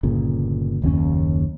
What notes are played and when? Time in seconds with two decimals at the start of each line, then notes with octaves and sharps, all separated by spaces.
0.03 G1 A#2 C#3
0.82 F#1 D#2 C#3 C#4